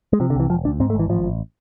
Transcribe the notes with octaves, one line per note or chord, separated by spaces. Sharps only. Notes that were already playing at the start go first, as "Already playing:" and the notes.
G#3
C3 F3
D3
C2 E3
E1 F3
D2 D4
G#2 C4
A3
G#1 E3
A1 F3
A1